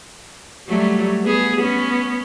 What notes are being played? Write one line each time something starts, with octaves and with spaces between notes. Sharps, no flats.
F#3 G3 A3
B3 G#4
B3 C#4